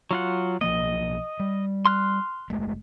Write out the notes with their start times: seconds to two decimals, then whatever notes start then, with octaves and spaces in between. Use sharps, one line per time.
0.11 F#3 F4 F#5
0.61 B1 F3 A#3 D#5
1.40 G3
1.86 C6 F6 F#6
2.50 F#1 G#3 A3